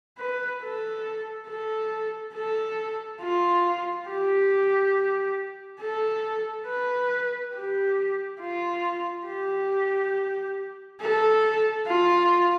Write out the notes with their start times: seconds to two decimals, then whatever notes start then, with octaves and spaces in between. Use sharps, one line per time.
0.18 B4
0.62 A4
1.48 A4
2.34 A4
3.21 F4
4.08 G4
5.80 A4
6.67 B4
7.55 G4
8.41 F4
9.27 G4
11.01 A4
11.87 F4